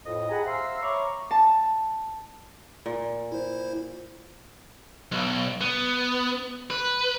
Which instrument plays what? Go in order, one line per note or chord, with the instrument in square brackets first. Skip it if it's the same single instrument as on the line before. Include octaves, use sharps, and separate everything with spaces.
[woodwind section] F2 A2 D#5
G4 G#4 F#5 G#5 A#5 B5
C5 E5 F5 A#5 C6 E6
C#5 E5 A#5 B5 C#6 D6
[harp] A5
[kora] A#2
[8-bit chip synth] E4 C5
[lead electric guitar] B1
B3
B4